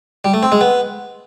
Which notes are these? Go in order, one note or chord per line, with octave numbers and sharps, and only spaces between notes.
G3
A3
C4
G#3
B3